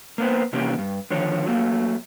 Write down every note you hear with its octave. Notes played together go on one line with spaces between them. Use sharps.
A#3 B3 C5
C3 E3 A#3 C#4 G4
G2
D3 D#3 F3 C#5
F#3 A3 A#3